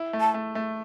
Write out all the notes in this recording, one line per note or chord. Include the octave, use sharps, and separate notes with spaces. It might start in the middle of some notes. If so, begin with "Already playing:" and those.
Already playing: E4
A3
A5
A3
A3